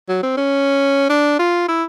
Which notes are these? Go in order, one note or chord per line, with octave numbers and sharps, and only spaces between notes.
F#3
C4
C#4
D4
F4
E4